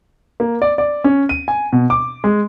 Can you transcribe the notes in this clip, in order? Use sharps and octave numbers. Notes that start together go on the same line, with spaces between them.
A#3
D5
D5
C#4
D#7
G#5
B2
D6
G#3